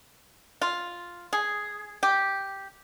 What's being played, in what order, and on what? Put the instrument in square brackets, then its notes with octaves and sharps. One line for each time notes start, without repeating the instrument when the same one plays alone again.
[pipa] F4
G#4
G4